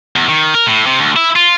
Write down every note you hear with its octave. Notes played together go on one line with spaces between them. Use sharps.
E2
D#3
A#4
A2
C3
D2
E4
F4